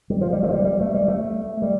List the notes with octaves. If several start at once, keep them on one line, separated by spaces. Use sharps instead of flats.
G3
F3
G3
A3
F3
G3
G3
A3
G3
A3
G3